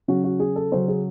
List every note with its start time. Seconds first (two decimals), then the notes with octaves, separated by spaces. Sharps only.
0.08 C#3 F#3 C#4 F#4
0.24 F#4
0.40 G#4
0.56 A4
0.72 C#3 F#3 C#4 C5
0.88 G#4